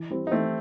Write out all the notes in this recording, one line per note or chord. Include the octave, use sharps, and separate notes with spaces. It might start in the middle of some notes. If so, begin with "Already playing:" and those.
Already playing: E3
G3 C4 E4
D#4
E3 A3 C4